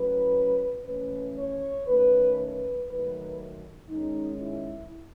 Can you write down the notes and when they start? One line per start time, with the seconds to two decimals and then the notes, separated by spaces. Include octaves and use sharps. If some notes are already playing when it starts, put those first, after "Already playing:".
Already playing: A2 F#3 C#4 B4
0.86 E3 A3 C#4 B4
1.37 C#5
1.87 D#3 A3 C#4 B4
2.38 B4
2.89 D#3 F#3 A3 B4
3.89 D#3 G#3 C#4 D#4
4.40 E4